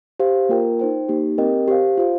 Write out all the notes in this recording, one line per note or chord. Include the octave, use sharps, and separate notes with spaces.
G4 C5 F5
A#3 F4 A#4 G5
D#4 C5 G5
A#3 D#4 G4
C4 G4 A#4 D#5 G5
G4 C5 F5
F4 C5 F5